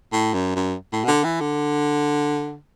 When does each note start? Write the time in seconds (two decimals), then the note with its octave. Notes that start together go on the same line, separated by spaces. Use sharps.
0.13 A2
0.34 F#2
0.55 F#2
0.93 A2
1.05 B2
1.08 D3
1.24 E3
1.40 D3